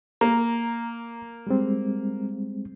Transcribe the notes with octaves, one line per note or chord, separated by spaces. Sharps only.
A#3 A#5
G3 G#3 C4